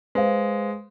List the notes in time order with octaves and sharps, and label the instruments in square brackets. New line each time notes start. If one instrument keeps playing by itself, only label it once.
[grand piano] G#3 [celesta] B4 C5 F5